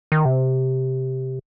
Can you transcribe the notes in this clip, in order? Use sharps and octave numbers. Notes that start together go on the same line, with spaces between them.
D#3
C3